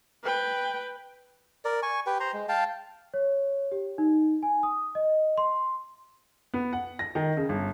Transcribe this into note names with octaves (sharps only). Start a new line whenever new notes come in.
B4 G5
A#4 D5
G#5 C#6
G4 B4 G5
C5 A#5 C6
G#3
F5 G5 A5
C#5
G4
D#4
G#5
D#6
D#5
C6
B3
F#5
A#6
D#3
C#3
G1